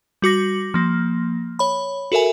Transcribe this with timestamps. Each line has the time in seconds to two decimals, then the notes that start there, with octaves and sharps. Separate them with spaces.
0.22 G3 F#4 D6 A#6
0.74 F3 A#3
1.59 C#5 B5
2.12 F#4 A4 A#4 E5 G#5